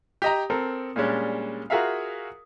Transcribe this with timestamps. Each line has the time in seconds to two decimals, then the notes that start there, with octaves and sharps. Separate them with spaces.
0.22 G4 D#5 A#5
0.50 C4 A4 A#4
0.96 A#2 G3 G#3 C#4 D4
1.70 F4 F#4 G#4 A#4 E5 F5